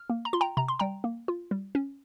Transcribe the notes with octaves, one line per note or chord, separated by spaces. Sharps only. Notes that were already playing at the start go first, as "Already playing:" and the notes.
Already playing: F6
A#3
A#5
F4 C6
G5 A#5
C3 A#5
C6
G3 G5 A#5
A#3
F4
G3
C#4